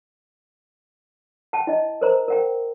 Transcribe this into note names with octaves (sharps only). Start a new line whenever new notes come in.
F#5 G5 A5
E4 D#5
A#4 C5 A#5
A#4 F#5 G5